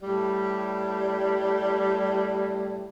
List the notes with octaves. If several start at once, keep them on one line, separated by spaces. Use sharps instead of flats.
A2 G3